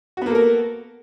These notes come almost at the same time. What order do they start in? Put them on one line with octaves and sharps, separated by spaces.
F#4 B3 A#3 A4 A#4